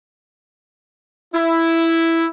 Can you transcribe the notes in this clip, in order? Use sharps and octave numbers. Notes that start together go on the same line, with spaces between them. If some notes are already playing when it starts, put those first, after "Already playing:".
E4